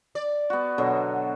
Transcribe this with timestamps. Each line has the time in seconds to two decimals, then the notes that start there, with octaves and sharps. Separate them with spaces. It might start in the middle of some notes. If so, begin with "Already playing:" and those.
0.15 D5
0.50 B3 F#4
0.78 B2 D3 F#3